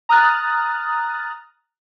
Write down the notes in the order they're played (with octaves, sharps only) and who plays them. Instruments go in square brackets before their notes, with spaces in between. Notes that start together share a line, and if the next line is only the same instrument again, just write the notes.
[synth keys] A#5 D#6 F6 F#6 A6